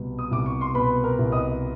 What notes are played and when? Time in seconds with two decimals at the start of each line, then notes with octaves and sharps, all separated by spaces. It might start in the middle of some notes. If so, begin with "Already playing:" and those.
Already playing: C2 B2 G3
0.19 D#6
0.31 C2 D6
0.46 C#6
0.61 C6
0.74 B2 B4 B5
1.04 A#4 A#5
1.19 C2
1.32 D#5 D#6